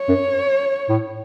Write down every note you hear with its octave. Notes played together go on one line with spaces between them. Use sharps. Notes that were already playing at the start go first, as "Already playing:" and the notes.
Already playing: C#5
F#2
A2